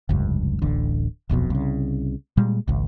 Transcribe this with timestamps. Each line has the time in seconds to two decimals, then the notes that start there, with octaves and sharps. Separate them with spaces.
0.09 F1 C#2 G2
0.62 D1 A1 D3
1.29 D#1 B1 F2 B2
1.50 C2 C#3
2.37 A#2 G3 G#3
2.68 G#1 C#2